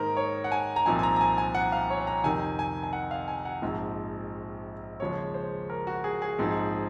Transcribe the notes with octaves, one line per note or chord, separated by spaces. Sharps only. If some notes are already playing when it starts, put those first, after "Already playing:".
Already playing: G#2 D#3 A#3 D#4 A#4 C5
C#5
F#5
G#5
A#5
C2 A#2 F3 C4 D#4 G#5
G#5
A#5
A#5
G#5
G#5
F#5
F5
C#5
A#5
F2 C3 D#3 G#5
G#5
G#5
F#5
F5
G#5
F#5
A#1 G#2 F3 C4 D#4
D#2 C#3 F3 G#3 C#5
C5
A#4
F#4
G#4
G#4
A#1 G#2 F3 C4 D#4